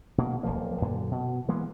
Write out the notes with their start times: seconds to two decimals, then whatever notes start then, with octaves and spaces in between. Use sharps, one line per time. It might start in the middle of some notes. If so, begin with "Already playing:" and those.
0.18 B2 A#3
0.43 D1 B1 F3 A#3
0.82 F#2 A#2 D3
1.12 B2
1.48 E3 G#3 A#3 B3